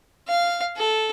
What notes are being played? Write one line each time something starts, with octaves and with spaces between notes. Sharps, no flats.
F5
A4